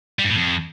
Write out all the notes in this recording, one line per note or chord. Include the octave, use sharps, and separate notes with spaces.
G3
G2
A2
F2